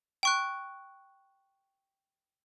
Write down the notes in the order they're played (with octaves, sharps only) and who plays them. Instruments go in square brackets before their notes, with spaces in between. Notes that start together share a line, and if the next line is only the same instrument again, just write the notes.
[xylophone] G5 C#6 F#6